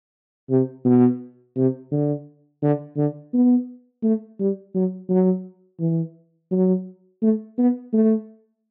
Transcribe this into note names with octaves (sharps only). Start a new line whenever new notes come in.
C3
B2
C3
D3
D3
D3
B3
A3
G3
F#3
F#3
E3
F#3
A3
B3
A3